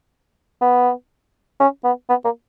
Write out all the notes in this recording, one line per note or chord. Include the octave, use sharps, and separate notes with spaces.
B3
C#4
B3
B3
A#3